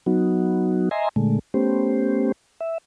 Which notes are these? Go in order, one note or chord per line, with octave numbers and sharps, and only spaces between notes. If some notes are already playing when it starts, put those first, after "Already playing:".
F#3 B3 D#4 F#4
D#5 E5 G#5 A#5 C6
A#2 D3 G#3 A3
A3 B3 C#4 G4 C5
E5